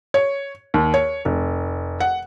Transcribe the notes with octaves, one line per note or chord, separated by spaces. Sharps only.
C#5
D#2
C#5
F1
F#5